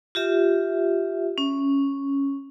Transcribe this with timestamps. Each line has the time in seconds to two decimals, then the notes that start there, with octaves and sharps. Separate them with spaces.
0.15 F4 G4 E5
1.38 C#4